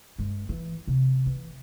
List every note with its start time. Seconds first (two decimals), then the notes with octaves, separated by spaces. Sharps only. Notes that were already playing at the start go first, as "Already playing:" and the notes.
0.18 G2 G#3
0.49 E3
0.87 C3
1.26 E3